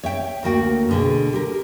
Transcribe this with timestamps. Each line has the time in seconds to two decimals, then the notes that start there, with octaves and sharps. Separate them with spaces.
0.03 C#5 E5 G5
0.43 D2 A#3 F#4 G5
0.89 B2 D3 G#4
1.33 G4 A#4